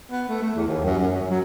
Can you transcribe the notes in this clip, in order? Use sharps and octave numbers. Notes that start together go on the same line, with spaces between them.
B3
A3
A3
E2
D#2
F#2
F#2
F#2
F#3